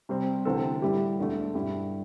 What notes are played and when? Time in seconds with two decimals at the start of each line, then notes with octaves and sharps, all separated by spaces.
0.09 C3 G3 C4
0.45 D2 C3 E3 C4 A4
0.82 A2 G3 E4 G4
1.18 E1 D2 D3 A3
1.54 G2 G3 E4